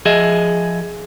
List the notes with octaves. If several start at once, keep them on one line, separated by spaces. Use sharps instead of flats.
F3 G#4 D#5 E5